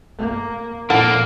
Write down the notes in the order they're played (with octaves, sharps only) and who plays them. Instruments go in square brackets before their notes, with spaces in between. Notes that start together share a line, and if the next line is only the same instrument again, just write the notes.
[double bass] A#3
[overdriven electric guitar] F2 A#3 [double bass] A#2 [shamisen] E4 A4 F#5